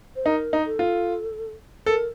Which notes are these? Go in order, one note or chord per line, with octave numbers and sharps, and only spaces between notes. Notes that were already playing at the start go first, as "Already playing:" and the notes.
C5
D#4 A#4
D#4
A4
F4
A4 A#4